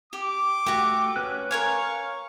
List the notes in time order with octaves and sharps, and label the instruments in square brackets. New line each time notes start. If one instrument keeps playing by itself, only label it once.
[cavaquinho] G4 [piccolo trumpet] D6
[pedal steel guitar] A3 [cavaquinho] F#4 G4
[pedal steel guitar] C#4 B4 F#6
[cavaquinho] A#4 C#5 G#5 [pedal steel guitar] F5 [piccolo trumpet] C#6